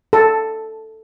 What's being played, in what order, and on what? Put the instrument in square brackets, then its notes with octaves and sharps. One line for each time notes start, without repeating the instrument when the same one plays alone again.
[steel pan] A4